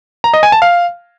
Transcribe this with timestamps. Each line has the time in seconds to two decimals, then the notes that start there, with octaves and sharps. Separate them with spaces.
0.24 A#5
0.33 D#5
0.43 G#5
0.52 A5
0.62 F5